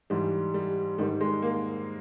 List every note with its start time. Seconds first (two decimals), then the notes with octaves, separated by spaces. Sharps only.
0.10 G#2 E3 G3
0.54 G3
0.98 G#2 D#3 G3
1.21 G#3
1.42 A#3